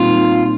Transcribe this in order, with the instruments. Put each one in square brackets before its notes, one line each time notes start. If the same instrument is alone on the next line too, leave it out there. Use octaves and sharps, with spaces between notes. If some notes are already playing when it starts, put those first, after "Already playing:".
Already playing: [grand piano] A#2 G3 C4 D#4 [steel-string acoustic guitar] F4